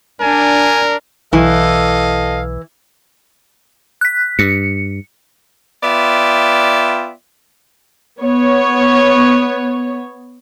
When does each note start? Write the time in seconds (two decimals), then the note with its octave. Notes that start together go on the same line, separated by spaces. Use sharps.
0.21 D4 A#4 G#5
1.33 B1 E3 A4 D#5 F5
4.01 F#6 B6
4.39 G2 C#7
5.83 B3 F4 D5 E5 G5
8.20 B3 C#5